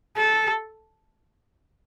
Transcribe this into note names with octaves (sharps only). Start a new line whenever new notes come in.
A4